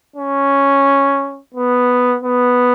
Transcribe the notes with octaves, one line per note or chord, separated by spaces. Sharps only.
C#4
B3
B3